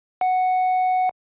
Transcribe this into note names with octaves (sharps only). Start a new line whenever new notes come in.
F#5